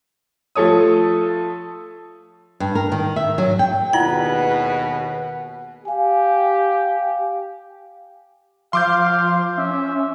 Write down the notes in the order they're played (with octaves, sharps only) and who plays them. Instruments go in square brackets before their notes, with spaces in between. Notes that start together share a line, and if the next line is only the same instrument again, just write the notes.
[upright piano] F3 A3 A4 C#5 D#6
[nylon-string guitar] G2
A#4
D#3
E5
F#3
G5
[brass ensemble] D#2 B2 [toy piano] E4 F4 D5 [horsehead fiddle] G#4 B4 [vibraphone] F#5
[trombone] G4 [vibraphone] F5 G#5
[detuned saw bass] F3 [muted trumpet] F5 [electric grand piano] C6 D6 G6
[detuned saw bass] C#4 [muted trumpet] E5